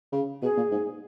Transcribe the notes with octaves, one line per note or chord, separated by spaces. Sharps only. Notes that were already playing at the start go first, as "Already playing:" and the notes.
C#3
B2 G#4
A#2
G#2